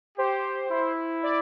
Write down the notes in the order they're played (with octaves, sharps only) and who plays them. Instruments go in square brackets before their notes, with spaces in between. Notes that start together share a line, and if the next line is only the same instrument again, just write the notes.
[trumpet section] G4 [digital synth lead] C5
[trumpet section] E4
[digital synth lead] D5